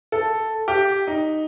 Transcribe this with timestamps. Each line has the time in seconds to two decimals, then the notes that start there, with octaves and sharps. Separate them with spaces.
0.12 A4
0.68 G4
1.07 D#4